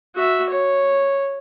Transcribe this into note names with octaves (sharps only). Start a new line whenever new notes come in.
F#4 E5
C#5